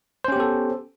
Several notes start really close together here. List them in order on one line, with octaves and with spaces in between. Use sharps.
C5 C#4 G4 B3 A4